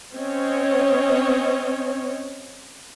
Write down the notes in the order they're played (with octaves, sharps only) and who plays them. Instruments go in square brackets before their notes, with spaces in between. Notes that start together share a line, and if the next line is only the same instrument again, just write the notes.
[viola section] C4 C#4 C#5 D#5